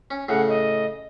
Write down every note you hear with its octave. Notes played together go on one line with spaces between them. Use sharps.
C#4
A2 C#3 F#5
D#5